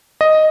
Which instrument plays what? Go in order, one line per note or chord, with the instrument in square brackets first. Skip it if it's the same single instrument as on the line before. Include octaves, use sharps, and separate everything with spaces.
[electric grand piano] D#5